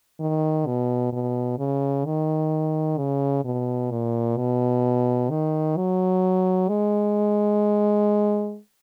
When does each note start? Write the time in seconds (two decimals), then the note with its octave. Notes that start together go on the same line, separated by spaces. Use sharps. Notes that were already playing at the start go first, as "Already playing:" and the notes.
0.20 D#3
0.66 B2
1.13 B2
1.59 C#3
2.06 D#3
2.98 C#3
3.45 B2
3.91 A#2
4.37 B2
5.31 D#3
5.77 F#3
6.69 G#3